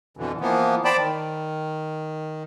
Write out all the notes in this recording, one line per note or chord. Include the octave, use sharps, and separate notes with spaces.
F2 B2 D3 E3
E3 F3 A#3 B3
C5 D5 G5 A5 B5
D#3